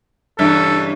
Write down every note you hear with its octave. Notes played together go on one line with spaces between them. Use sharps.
G2 C#3 E3 A4